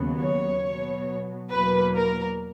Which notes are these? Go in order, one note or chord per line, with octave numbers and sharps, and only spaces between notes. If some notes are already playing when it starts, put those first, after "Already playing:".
Already playing: D#2 C#3 F#3 B3
C#5
B2 F#3 B3
E2 B2 F#3 A#3 B4
A#4